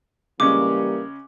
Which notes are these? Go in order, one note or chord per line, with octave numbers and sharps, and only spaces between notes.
C#3 E3 G3 G#3 A#3 C#4 D6